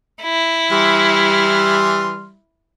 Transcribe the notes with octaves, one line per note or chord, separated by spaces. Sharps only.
E4
E3 G3 C6 F6